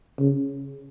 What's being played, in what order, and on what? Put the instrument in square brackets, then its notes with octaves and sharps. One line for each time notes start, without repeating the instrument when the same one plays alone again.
[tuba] C#3